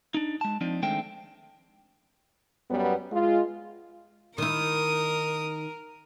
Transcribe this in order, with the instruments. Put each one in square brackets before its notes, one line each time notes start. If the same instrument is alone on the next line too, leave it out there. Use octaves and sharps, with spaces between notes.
[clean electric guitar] D4 D#4
G#3 A5
F3 C4 D4 D#4
D#3 G#3 A3 C4 D4 G5
[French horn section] F#2 G3 B3
G#3 F4
[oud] D#3 E4 [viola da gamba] A#4 [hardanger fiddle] D#6